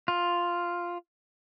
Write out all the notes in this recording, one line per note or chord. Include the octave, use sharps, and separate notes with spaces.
F4